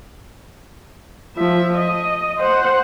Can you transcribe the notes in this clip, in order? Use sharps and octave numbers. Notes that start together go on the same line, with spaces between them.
F3 E5
D#5
C5 F#5